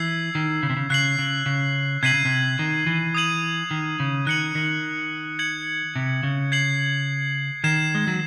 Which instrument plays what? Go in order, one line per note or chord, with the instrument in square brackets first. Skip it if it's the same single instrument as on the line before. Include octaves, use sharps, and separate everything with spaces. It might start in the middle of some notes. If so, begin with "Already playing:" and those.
Already playing: [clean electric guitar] E3 [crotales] E6 G#6 C7 F#7
[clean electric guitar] D#3
C#3
C3
C#3
[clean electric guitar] C#3 [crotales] F#6 C7 F#7
[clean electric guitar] C#3
C#3
[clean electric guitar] C3 [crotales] G#6 C7 D#7 F#7
[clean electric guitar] C#3
C3
D#3
E3
[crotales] D#6 G#6 D#7 F#7
[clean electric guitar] D#3
C#3
[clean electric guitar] D#3 [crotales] F#6 C#7 F#7
[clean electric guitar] D#3
[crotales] G#6 C#7 F#7
[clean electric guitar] C3
C#3
[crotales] G#6 C7 F#7
[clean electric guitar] D#3 [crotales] G#6 C7 E7
[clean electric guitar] G#3
F#3